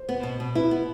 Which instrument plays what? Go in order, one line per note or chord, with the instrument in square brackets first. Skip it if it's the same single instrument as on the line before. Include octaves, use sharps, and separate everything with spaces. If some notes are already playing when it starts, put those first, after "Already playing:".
Already playing: [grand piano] C5
[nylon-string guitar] B3
B2
B2
[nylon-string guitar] E4 [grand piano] B4
[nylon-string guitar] B3